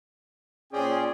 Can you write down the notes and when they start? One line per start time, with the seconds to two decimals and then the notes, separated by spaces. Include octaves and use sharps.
0.73 A#2 C#4 G#4 C5 D5 G5